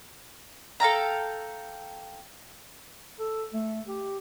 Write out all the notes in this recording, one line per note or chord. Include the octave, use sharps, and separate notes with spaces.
A4 F5 G5 A#5
A4
A3
G4